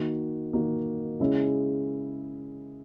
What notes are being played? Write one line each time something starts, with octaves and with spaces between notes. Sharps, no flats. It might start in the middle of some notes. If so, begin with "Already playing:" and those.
Already playing: D#3 A#3 D#4 F#4
D#3 A#3 D#4 F#4
C#3 G#3 C#4 E4